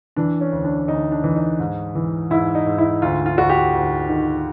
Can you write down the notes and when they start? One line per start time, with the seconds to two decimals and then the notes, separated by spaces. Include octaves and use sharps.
0.16 E3 D4
0.41 C#4
0.52 D2
0.65 D4
0.88 D2 D#4
1.12 D4
1.24 E3
1.36 D#4
1.60 G#2
1.95 E3
2.31 G#2 E4
2.55 D#4
2.66 G#2
2.78 E4
3.02 D2 F4
3.26 F4
3.38 D2 F#4
3.49 G4
3.73 D2
4.09 D#3